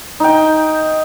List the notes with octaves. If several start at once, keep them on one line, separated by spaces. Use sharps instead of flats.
D#4 G5